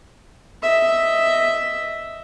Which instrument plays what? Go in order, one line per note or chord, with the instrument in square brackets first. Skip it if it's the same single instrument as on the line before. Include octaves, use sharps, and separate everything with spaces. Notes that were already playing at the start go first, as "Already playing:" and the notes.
[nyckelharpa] D#5 E5